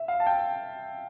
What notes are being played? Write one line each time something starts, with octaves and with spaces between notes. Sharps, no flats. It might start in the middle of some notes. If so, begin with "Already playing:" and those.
Already playing: E5
F5
A5
G5